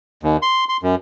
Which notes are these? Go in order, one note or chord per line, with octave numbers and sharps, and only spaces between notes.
D#2
C6
C6
F#2